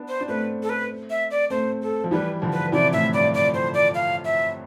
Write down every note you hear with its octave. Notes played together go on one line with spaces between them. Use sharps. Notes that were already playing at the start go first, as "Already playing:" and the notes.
Already playing: B3 D4
C5
D4
A3 C4 B4
A4
B4
E5
D5
A3 C4 C5
A4
F3
E3 G3 B4
D3 F3
B4
C3 E3 D5
A2 E5
G2 D5
D5
C5
D5
F5
E5